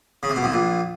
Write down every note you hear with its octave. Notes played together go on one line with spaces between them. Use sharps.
C#3
C3
B2
C2 C3
A#1 A#2